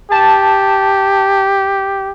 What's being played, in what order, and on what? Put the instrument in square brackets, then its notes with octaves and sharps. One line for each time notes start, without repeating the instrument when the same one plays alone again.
[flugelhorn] G4 [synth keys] A5